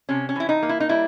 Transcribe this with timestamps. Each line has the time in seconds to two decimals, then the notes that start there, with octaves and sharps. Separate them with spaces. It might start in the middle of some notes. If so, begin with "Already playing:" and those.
0.09 C3 C#4
0.29 C#4
0.36 E3 E4
0.49 D#4
0.63 A#3
0.69 E4
0.80 D#4
0.89 G3 E4